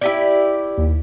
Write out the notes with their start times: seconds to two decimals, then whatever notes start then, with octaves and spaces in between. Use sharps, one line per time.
0.01 E4 G4 D5
0.78 D#2